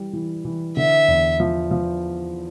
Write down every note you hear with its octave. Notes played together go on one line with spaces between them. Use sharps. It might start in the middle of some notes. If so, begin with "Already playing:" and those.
Already playing: E3 G3
E3
E3
D3 E5
E2
F3
F3